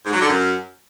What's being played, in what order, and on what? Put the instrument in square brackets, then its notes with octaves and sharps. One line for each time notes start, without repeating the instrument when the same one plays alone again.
[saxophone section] G#2
F#3
D3
F#2